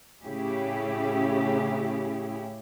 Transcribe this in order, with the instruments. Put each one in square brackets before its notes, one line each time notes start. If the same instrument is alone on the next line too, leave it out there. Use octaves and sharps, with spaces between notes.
[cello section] A2 C#3 C#4 E4 G4 G#4